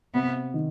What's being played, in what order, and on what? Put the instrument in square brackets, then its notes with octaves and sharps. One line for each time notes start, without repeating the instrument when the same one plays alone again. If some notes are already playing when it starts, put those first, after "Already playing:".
[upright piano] C3 [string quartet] B3
[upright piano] D#3